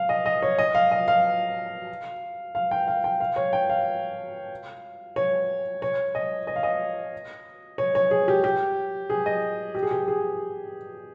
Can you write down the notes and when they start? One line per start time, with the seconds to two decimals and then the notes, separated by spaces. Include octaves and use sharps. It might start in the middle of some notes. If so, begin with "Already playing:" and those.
Already playing: F5
0.09 D#5
0.26 D#5
0.42 C#5
0.58 D#5
0.75 F5
0.91 D#5
1.08 F5
2.55 F5
2.71 G5
2.87 F5
3.04 G5
3.20 F5
3.36 C#5
3.53 G5
3.69 F5
5.16 C#5
5.82 C#5
6.15 D#5
6.47 D#5
6.56 F5
6.63 D#5
7.78 C#5
7.95 C#5
8.11 G#4
8.28 G4
8.44 G4
9.10 G#4
9.26 D#5
9.75 G4
9.83 G#4
9.91 G4
10.08 G#4